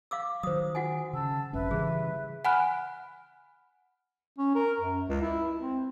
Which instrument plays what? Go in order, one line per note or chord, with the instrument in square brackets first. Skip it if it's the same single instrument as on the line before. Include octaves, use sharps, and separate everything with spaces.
[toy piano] F5 D6 E6
[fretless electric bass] D#3 F#3 [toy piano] C5 D#6
[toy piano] F#4 F#5 G#5
[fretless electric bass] C#3 [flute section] A5 E6
[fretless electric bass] G#1 F#2 C#4 [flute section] B4 E5
[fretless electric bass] C#3 E3 G3 [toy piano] G#4
[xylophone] F#5 G#5 B5 F6 F#6
[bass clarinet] C#4
A#4
F#2
C#2
E4
C4